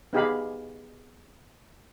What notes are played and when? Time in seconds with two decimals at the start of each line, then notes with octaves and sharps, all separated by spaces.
0.13 B3 D#4 G4 G#4 F5 B5